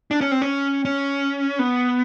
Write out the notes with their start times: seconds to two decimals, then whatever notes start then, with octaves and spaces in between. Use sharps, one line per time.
0.11 D4
0.21 C#4
0.32 C4
0.42 C#4
0.85 C#4
1.59 B3